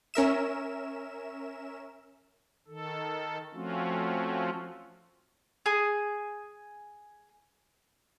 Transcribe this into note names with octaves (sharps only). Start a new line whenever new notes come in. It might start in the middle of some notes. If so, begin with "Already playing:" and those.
C#4 A#4 E5 E7
D#3 A4
F3 A3 C4 C#4 F4 F#4
G#4 G#5 D#6